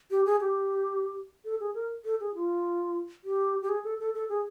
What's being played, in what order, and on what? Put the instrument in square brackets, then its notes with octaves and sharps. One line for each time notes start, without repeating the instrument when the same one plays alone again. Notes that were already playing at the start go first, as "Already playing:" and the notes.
[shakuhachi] G4
G#4
G4
A4
G#4
A#4
A4
G#4
F4
G4
G4
G#4
A4
A4
A4
G#4